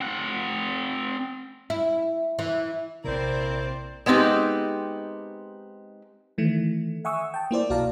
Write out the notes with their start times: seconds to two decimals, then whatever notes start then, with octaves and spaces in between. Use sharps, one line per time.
0.01 C4 F#5
1.70 E4
2.39 E3
3.05 A#1 C3 A#3 C4 E4 C5 D5
4.06 G#3 B3 C4 D#4 G4
6.38 D#3 E3 A3
7.05 E5 F#5 G#5 C#6 D#6 E6
7.34 G5 A5
7.51 A#3 E4 C5 D5
7.70 B1 F#4 D5 F5 A5 A#5